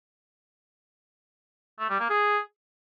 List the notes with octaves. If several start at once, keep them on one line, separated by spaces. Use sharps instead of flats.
A3
G3
A#3
G#4